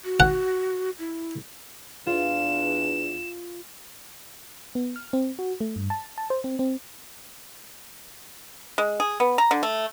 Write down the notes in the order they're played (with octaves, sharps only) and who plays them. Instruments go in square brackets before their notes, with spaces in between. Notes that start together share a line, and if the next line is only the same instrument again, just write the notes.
[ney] F#4
[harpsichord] F#5
[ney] E4
[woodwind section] E2 D4 [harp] F4 [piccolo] E7
[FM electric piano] B3
F6
C4
F#4
A3
G2
A5
A5
C5
C4
C4
[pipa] G#3
G#4
B3
A#5
D3
A3